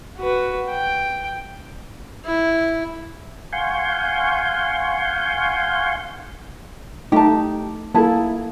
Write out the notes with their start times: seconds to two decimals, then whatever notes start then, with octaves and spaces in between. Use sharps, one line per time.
0.19 F#4 B4
0.71 G5
2.25 E4
3.53 F5 F#5 G#5 C6 C#6 G6
7.12 A3 D#4 G4 A5
7.95 A#3 E4 G#4 A4 A5